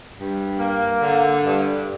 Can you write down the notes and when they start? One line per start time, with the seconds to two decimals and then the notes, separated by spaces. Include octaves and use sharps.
0.17 G2
0.59 A#3
1.02 D3
1.45 G2